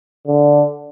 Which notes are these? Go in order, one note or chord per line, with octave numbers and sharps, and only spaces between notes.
D3